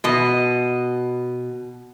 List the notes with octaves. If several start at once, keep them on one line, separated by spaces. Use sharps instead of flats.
B2 D#5